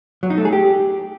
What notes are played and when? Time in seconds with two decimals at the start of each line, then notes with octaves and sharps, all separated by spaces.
0.23 F#3
0.30 D#4
0.38 A3
0.45 G#4
0.53 G4